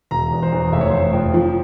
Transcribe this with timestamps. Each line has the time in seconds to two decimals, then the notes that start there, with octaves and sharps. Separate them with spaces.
0.11 E1 A#5
0.32 E2
0.42 C5
0.52 E2
0.72 F1 E5
0.81 C#5
0.90 F1 C5
0.99 C#5
1.13 F2
1.34 F3